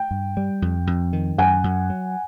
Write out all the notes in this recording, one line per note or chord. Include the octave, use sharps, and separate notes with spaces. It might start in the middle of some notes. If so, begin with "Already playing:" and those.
Already playing: G5
G2
G3
F2
F2
D#3
F#2 F#5 G#5
F#2
F#3